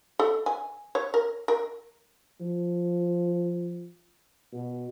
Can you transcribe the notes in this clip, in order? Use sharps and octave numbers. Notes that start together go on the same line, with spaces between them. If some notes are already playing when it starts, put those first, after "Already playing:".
A4
G#5
C#5
A#4
A#4
F3
B2